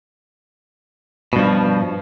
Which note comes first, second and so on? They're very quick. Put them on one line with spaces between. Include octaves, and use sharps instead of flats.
B2 G2 F3